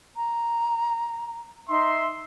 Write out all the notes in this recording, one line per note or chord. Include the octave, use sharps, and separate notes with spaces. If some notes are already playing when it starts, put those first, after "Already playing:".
A#5
D#4 E5 C6